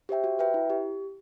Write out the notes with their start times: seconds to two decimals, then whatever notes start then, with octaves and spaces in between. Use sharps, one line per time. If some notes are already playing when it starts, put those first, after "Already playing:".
0.09 G4 C5 E5 G5
0.24 F#4
0.39 B4 E5 G5
0.54 E4
0.70 G4